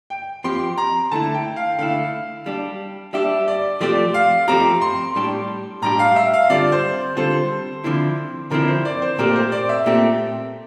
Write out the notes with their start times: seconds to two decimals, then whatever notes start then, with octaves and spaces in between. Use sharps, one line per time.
0.10 G5
0.44 F3 C4 G4 C6
0.78 A#5
1.12 D3 A3 E4 A5
1.34 G5
1.56 F5
1.79 D3 A3 E4 F5
2.46 G3 D4 G4
3.13 G3 D4 G4 E5
3.48 D5
3.81 F3 A3 C4 G4 D5
4.14 F5
4.48 F3 A3 C4 G4 A#5
4.81 C6
5.15 A2 G3 D4 G4
5.82 A2 G3 D4 G4 A#5
5.99 F5
6.16 E5
6.33 F5
6.50 D3 G3 C4 F4 A4 D5
6.72 C5
7.17 D3 G3 C4 F4 A4 C5
7.84 D3 F3 C4 E4
8.51 D3 F3 C4 E4 A#4
8.68 C5
8.85 D5
9.02 C5
9.18 A#2 A3 C4 G4 A#4
9.36 C5
9.52 D5
9.69 E5
9.86 A#2 A3 C4 G4